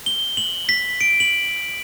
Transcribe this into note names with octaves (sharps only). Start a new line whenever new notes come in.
G7
F#7
B6
D7
F#7